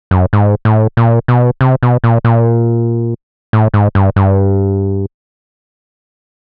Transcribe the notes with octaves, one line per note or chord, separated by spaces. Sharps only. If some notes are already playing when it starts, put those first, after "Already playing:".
F#2
G#2
A2
A#2
B2
C3
B2
A#2
A#2
A2
G#2
G2
G2